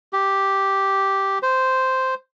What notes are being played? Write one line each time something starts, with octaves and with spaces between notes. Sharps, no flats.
G4
C5